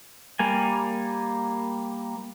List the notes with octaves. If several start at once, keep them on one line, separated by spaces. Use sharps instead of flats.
G3 A#3 G#5